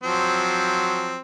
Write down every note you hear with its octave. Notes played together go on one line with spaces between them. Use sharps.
F3 F#3 C4